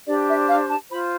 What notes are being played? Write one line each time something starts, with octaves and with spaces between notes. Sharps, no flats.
D4 G4 C5 D5
E5
F5
A5
F4 C5 B5